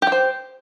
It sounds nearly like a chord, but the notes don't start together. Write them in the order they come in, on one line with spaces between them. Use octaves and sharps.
G4 G5 C5